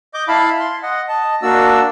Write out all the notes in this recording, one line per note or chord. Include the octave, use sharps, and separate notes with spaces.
D#5 D6 G6
E4 F5 A5 B5
C6
D#5 F#5
D#5 A5
A#3 D4 F#4 D5 E6